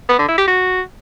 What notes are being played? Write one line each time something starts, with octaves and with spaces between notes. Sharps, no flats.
B3
D3
E4
G4
F#4